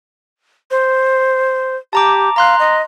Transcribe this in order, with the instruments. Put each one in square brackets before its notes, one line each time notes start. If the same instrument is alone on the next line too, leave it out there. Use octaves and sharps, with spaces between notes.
[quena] C5
[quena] G4 [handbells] A5 A#5 D6
[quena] F5 [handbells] A#5 C6 F#6
[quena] D#5